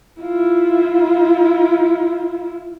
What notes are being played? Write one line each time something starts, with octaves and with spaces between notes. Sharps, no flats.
E4 F4